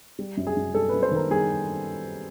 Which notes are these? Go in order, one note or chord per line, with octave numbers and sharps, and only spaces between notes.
G3
F#2
G#4
F#2
G3 A4
B4
F#2
C5
D#3 A#4
G3 G#4